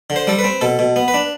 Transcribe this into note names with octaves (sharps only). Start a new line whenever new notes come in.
D3
C5
G3 A4
B4
C4
B2 A4
B2
B3
B4
D4